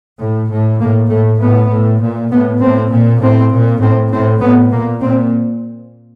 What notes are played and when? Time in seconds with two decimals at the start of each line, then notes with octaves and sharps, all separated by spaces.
0.20 A2
0.50 A2
0.80 A2 A#3
1.10 A2 A3
1.41 A2 B3
1.70 A2
2.00 A#2
2.31 A2 B3
2.61 A2 C4
2.91 A#2
3.22 A2 C4
3.52 A#2
3.81 A2 C4
4.12 A2 C4
4.42 A2 B3
4.72 A#2 A#3
5.02 A#2 C4